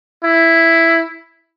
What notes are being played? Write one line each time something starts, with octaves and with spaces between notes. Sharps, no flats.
E4